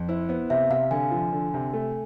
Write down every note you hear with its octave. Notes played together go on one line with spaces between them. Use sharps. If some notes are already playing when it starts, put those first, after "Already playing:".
Already playing: F2
E4 C5
B3 C5
C3 E5
C3 F5
D3 G#5
F3
D3
C3
A3